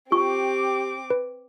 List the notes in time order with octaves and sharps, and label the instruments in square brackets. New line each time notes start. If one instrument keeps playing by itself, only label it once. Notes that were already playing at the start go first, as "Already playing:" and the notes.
[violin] C4 D6 [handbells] F4 [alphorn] G4 [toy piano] C#6
[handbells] B4